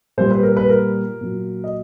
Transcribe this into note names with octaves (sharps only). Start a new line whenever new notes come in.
A#2 G3 C5
B4
A#4
B4
A#4
A#2 F#3
D#5